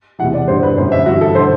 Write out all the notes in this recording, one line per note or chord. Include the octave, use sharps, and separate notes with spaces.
E2 C3 E3 F#5
D5
G2 D3 C5
B4
F#2 D3 C5
E5
G2 E3 F#4
A4
C5
D3